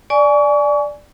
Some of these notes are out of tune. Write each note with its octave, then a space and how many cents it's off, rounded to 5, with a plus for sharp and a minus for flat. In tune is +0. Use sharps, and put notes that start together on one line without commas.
D5 +0 G#5 +15 C#6 +35